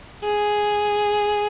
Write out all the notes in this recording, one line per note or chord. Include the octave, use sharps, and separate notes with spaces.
G#4